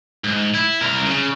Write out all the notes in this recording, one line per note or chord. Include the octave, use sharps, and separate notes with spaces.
G#2
E4
C2 A#4
C#3